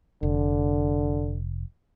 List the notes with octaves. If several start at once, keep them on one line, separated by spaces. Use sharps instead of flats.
F1 D3